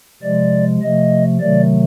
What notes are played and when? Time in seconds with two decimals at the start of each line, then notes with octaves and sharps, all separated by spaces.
0.22 C3 F3 G#3 D5
0.82 C3 F3 A3 D#5
1.40 C3 D#3 F#3 A3 D5